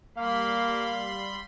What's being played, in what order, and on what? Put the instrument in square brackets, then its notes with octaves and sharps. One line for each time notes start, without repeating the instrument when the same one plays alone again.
[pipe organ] G3 B5 C6 [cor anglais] A#3 [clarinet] F5